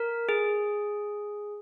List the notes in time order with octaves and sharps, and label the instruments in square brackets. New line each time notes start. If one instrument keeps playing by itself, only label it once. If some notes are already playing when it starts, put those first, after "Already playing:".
Already playing: [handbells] A#4
G#4